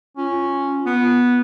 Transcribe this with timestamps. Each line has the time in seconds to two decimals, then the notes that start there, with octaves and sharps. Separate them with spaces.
0.17 C#4 F4
0.31 F4
0.86 B3